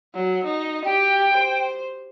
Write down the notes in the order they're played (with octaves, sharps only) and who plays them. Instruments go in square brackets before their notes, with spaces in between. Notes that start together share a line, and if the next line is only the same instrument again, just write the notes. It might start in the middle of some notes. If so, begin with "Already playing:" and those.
[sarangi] F#3
D#4
[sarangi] G4 [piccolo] G5
[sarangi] C5